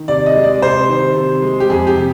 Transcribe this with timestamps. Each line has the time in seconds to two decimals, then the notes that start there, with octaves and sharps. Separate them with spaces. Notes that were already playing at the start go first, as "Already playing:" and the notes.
Already playing: D#3
0.08 C3 D5
0.26 D#5
0.36 G#3
0.43 D5
0.62 C3 C5
0.89 D#3
1.16 C3
1.42 G#3
1.60 G4
1.69 F2 G#4
1.87 G4
1.96 C3